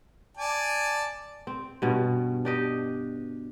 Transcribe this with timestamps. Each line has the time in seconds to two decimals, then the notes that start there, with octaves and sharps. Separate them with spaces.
0.37 D5 G#5 A5
1.47 C4
1.82 G2 B2 C#4
2.45 D4 G4 D#5